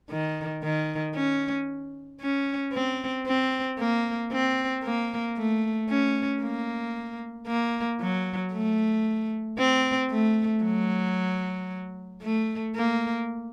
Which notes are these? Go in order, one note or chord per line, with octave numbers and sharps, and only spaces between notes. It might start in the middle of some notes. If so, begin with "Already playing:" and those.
D#3
D#3
C#4
C#4
C4
C4
A#3
C4
A#3
A3
C#4
A#3
A#3
F#3
A3
C4
A3
F#3
A3
A#3